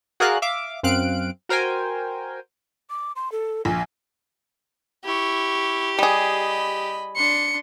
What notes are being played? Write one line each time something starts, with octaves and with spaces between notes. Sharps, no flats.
F#4 G#4 A#4 D5 F5 F#6
E5 F5 D6
F#2 C4 F5 F#6 D7
F#4 A#4 C5 G5 G#5
D6
C6
A4
A#1 G#5
E4 G4 C#6
G3 G#4 D#5 B5
D4 C6 C#7